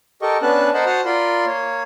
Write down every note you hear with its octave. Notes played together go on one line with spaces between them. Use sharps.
G4 A4 A#4 D#5 C#6
B3 C#4 D4 B4 A5 F#6
A#4 C5 D#5 F#5 A5 B5
F#4 C5 F#5 A5 D#6 F6
F4 A#4 D5 B5 C6
A#3 C#5